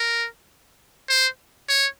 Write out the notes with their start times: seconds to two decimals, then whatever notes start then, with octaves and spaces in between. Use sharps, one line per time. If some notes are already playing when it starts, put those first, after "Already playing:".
Already playing: A#4
1.09 C5
1.69 C#5